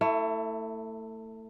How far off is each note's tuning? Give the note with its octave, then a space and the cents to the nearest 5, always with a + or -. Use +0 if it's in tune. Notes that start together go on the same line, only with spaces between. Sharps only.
A3 +25 E4 -5